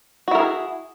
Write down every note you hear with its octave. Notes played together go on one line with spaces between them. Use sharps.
E4 F#4 G#4 A#4